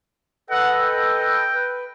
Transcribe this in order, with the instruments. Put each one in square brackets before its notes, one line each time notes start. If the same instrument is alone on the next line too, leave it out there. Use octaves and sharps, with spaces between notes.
[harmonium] A4 B4 D#5 [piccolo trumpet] F#5
[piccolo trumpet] G5
[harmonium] B4